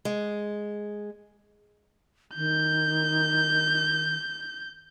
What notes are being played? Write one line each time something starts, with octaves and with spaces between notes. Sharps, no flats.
G#3
D#3 G6